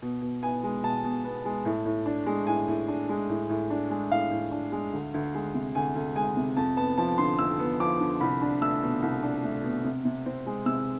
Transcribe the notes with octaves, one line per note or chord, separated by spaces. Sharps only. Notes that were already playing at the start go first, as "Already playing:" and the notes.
B2
B2
B3 G#5
G#3
B2 A5
B2
B3
G#3
A2
A2
D4
G#3
A2 G#5
A2
D4
G#3
A2
A2
D4
G#3
A2 F5
A2
D4
G#3
D2
D2
G#3
C3
D2 G#5
D2
G#3 G#5
C3
F2 A5
B3 A5
F3 A5
D3 C6
F2 E6
B3
F3 D6
D3
C2 B5
D4
A3 E6
B2
C2
D4
A3
B2
C3
C3
C4
G#3
C3 E6